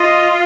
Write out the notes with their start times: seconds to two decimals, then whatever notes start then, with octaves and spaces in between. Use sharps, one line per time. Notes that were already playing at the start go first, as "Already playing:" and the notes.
Already playing: F4 D#5